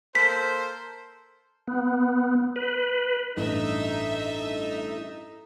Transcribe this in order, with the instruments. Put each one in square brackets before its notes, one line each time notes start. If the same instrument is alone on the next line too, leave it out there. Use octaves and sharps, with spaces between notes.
[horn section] A#3 A4 C5 [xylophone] B6
[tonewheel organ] B3
B4
[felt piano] A1 G2 [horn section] D#4 [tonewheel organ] E4 A4 [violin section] E5